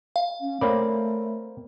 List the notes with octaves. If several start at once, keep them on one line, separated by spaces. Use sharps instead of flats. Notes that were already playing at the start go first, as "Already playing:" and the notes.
F5
C#4
A3 A#3 C4 A#4 C#5 D5 B5